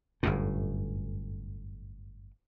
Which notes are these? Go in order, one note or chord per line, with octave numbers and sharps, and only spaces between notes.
G1 F#2 A2